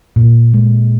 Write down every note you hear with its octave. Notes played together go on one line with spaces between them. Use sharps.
A#2
G#3